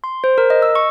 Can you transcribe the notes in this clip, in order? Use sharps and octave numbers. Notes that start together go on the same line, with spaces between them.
C6
C5
A#4
D#5
E6
C#6